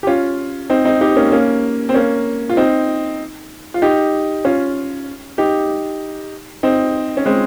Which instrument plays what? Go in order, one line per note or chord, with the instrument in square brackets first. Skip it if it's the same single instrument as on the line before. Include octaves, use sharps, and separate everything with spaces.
[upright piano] G4
C#4 F4
C4 D#4
C4 D#4
D#4 G4
A#3 C#4
A#3 C#4
C4
A#3 C#4
F4
C4 D#4
F4
D#4 G4
C#4 F4
D#4 G4
C4 D#4
C#4
G#3 C4